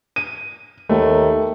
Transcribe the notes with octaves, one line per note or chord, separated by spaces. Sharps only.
D#7
D#2 A3